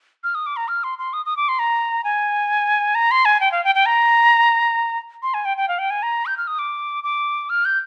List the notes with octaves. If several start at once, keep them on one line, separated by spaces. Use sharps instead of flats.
F6
D#6
D6
A#5
F6
C6
C6
D#6
D#6
D6
C6
A#5
G#5
A#5
C6
G#5
G5
F5
G5
G5
A#5
C6
G#5
G5
G5
F5
G5
G#5
A#5
G6
F6
D#6
D6
D6
F6
G6